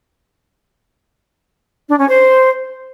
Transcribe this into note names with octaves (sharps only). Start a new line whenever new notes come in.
D4
C#4
C5